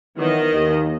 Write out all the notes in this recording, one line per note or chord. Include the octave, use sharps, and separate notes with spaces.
D#3 E3 F#3 B3 D#5
D#2